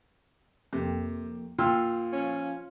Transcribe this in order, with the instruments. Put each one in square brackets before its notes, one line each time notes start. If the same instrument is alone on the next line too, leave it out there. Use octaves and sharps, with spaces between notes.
[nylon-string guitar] F2 A#3 [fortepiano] C3
[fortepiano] A#2 E6 [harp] F4 [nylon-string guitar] C5 G5
[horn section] F3 C#4